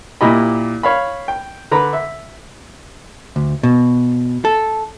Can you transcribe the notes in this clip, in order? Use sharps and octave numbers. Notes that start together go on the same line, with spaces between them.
A#2 E4 G4 D#5 B5
C#5 F5 B5
G5
D3 B4 A#5 B5
E5
D2
B2
A4